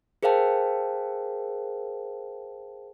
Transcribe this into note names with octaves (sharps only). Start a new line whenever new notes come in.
G#4 A#4 C5 F5 G5 A5